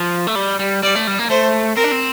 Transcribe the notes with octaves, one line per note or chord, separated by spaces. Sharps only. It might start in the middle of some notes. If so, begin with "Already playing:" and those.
Already playing: F3
A3
G3
G3
G3 D5
A3
G3
A#3
A3 C5
C4 A#4
D4
C4